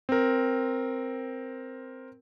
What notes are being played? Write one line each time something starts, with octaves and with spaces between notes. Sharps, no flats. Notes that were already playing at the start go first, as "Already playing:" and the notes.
C4 A#4